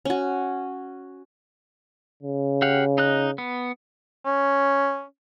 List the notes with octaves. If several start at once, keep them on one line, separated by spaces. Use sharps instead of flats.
C#4 F#4
C#3
G4 F5 F#5
D#4 D#5 F#6
B3
C#4